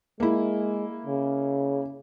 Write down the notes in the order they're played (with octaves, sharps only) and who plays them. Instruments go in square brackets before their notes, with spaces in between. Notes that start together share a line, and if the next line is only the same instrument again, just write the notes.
[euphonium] G#3 [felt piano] A#3 E4
[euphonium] C#3